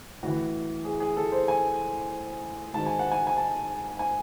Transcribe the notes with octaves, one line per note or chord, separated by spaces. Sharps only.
A2 E3 F#4
G#4
G#4
A4
C5
G#5
G#2 D#3 F#3 A5
G#5
F#5
G#5
G#5
A5
G#5